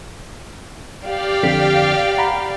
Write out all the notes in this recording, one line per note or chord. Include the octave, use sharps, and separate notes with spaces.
G4 D5 F5
F2 D3 B6
F#5 A#5 B5